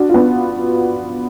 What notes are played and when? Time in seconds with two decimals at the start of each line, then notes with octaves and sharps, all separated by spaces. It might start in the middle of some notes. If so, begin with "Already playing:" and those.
Already playing: D4 F#4
0.09 F4
0.14 B3 D4